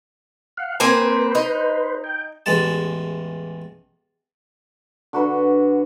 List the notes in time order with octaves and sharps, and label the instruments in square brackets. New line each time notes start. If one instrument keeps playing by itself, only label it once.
[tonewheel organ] F5 F#5
[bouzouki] A#3 C4 G#5 [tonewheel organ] B4 C5
[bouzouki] D#4
[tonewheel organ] G5
[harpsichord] A1 E2 G#3 A5
[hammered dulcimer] D3 F#4 B4